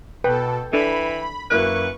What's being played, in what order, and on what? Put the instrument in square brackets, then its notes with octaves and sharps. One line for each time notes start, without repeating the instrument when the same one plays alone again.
[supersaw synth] B2 A4 [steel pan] B4 [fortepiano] G5
[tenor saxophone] E3 [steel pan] D4 A4 [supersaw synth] B5
[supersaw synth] F#2 C#6 [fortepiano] A#3 E4 F#6 [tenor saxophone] B4